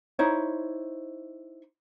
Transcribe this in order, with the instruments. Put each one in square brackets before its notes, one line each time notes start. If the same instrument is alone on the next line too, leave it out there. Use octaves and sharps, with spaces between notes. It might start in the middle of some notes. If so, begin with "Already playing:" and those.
[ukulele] D#4 E4 C5 C#5